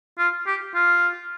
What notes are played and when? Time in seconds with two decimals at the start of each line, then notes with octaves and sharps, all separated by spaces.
0.19 F4
0.47 G4
0.74 F4